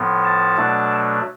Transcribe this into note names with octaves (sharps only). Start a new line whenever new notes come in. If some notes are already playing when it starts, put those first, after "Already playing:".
Already playing: A2 F3 B3
A5
B2 F#3 A3 D4